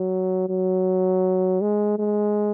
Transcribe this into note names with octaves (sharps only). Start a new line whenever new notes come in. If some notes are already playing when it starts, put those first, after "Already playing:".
Already playing: F#3
F#3
G#3
G#3